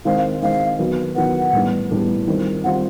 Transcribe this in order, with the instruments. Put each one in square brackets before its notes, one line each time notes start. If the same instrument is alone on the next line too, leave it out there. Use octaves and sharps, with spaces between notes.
[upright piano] D#3 G#3 C4 [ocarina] F5
[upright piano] D#3 G#3 C4 [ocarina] F5
[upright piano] D#3 F#3 B3
[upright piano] D#3 F#3 B3 [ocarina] F#5
[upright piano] A2 E3 G3 B3 D4
A2 E3 G3 B3 D4
D#3 G3 C4 F4
[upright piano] D#3 G3 C4 F4 [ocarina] F#5